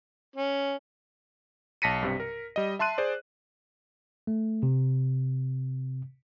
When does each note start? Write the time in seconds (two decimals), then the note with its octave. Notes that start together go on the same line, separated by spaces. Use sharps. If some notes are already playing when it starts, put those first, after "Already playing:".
0.36 C#4
1.82 B1 A5 A#6 B6 C#7 D#7
2.03 G2 C3
2.20 A#4
2.56 G3 D#5
2.79 E5 A5 C6 F#6 D#7
2.98 G#4 C5 D5
4.27 A3
4.63 C3